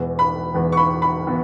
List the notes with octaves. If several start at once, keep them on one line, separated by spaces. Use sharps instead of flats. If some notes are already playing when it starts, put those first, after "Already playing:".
Already playing: E1 E2 E3 B3
B5
E1 E2 E3 B3
C#6
B5
B5
E3 B3